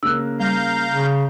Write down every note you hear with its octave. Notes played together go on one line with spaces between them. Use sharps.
C#3 A#3 E6 F#6
G3 F5 A#5 G6
C#3